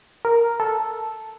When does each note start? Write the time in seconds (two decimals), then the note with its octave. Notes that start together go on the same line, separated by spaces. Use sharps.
0.25 A#4
0.60 A4